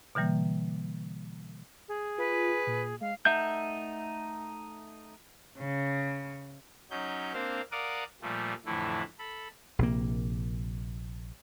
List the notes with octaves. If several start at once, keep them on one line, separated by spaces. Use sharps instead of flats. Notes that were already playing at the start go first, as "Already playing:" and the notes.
B2 D3 E3 G3 A#3
G#4
F4 B4
A#2
G#3 F5
A3 D#4 E5 F#5 G6
C#3
F#3 C#4 D#4 G6
A#3 C4 D4 C5 F5
A#4 D5 F5 F#5 D6 D#6
A#2 F3 G3 A3
F2 A2 D3 E3 A3 E4
A4 B5
A#1 C3 A#3